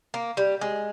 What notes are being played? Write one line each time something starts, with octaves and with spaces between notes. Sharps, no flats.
A#3
G3
G#3